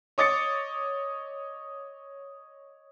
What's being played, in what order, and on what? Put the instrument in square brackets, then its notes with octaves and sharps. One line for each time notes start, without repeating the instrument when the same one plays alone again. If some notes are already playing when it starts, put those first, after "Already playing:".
[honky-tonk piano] C#5 D#5 D6 A6 C#7